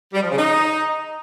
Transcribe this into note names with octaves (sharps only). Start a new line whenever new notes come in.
G3
F3
C#3
D#4